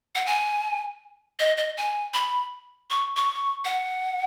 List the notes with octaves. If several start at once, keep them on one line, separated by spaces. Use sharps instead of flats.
F#5
G#5
D#5
D#5
G#5
B5
C#6
C#6
F#5